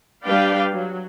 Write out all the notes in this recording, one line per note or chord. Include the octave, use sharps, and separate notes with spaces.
G3 D4 B4 D5 F5 G5
F#3